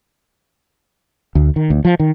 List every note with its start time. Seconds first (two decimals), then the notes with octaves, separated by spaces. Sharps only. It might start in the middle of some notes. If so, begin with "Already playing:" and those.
1.35 D2
1.56 D#3
1.70 D2
1.85 F3
2.00 D#3